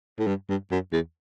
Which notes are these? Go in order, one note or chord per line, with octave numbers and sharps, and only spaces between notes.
A2
G2
G2
F#2
E2